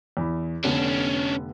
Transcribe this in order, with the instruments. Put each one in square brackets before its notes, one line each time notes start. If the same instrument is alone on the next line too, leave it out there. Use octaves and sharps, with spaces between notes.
[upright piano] E2 B5
[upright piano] F1 D3 B3 [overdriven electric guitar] C#4 D4